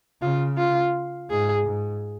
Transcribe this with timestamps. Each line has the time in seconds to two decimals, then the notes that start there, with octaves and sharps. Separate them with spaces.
0.22 C#3 F4
0.58 F4
1.30 G#2 G#4
1.67 G#2